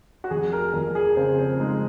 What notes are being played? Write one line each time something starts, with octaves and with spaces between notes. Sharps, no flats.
F#4
F1 G#4
A#4
F2 A#4
G#4
C#3 C4
C4
G#3 D#4